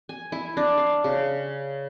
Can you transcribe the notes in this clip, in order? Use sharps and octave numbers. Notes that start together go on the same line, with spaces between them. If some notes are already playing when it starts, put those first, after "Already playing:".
G#5
E4
D4
F5
C#3